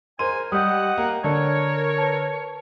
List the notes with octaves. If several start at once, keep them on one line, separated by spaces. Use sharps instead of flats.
G#2 A#4 C5 G#5 C6 D#7
G3 G4 D#5 F#5 D#6 G6
A#3
D3 A#4 C#5 D5 A5
B4 A5